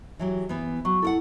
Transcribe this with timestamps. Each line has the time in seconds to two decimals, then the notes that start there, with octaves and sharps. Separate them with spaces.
0.19 E3 F#3 G4
0.49 E3 B3
0.85 F#3 C#6
1.02 E4 A4 A#4 F#5